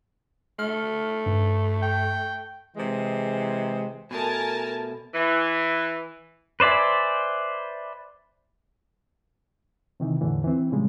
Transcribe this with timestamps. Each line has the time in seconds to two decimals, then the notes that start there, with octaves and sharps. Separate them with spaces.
0.59 A3 F6
1.26 G2
1.83 G5
2.77 C3 E3 G#3
4.11 B2 A3 A#4 G#5 A5
5.14 E3
6.60 B4 C5 D5 E5 G#5
10.00 C3 D#3 E3
10.21 E2 A2 D3 E3
10.44 E3 C4
10.72 A#2 C#3 F3 G3 G#3